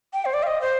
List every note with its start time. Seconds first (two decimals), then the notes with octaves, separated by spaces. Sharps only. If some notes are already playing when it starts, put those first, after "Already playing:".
0.13 G5
0.25 C5
0.34 D5
0.43 F5
0.47 D#5
0.61 C5